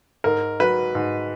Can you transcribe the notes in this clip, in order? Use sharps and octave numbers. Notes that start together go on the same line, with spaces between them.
G#2 A#4
F#3 B4
G#2